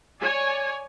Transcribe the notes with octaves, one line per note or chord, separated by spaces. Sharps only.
C#5 D5 G#5